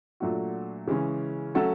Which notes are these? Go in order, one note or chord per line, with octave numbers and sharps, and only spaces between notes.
A#2 F#3 A3 D4 F#4
C#3 E3 G#3 C#4
F#3 A3 C#4 F#4 A4